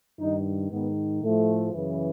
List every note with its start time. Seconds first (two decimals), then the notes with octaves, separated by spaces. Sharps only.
0.19 G2 D#3 D#4
0.70 G#2 D#3 B3
1.22 A2 F3 A3
1.73 F#2 C#3 E3